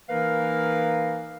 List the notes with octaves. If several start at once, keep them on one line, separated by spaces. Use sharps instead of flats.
E3 A#3 D#4 A#4 B4 F5